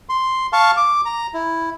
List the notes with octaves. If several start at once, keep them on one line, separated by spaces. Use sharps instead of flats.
C6
F5 A5 C#6
D6
A#5
E4